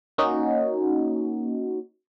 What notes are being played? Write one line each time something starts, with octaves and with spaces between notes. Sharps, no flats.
A#3 C#4 D#4 F#4